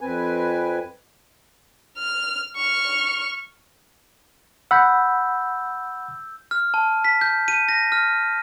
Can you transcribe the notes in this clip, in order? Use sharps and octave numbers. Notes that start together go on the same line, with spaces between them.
F2 C4 B4 G#5
F6
C#6 F6
F#5 B5 E6 G6
F6
A5
B6
G6
D#7
A#6
F6